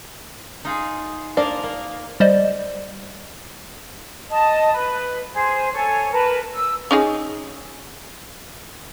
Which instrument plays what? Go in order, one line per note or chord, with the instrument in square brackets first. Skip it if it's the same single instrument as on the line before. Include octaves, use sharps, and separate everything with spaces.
[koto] D#4 F4 G#4
[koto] A#3 A#4 [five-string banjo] D4 C5 D5
[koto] A#3
[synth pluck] G3 C5 D5 D#5
[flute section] D#5 A5 D#6
B4
G#4 C5
A4 C#5 G#5
A#4 B4 A5
E6
[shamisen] C#4 D#4 G#4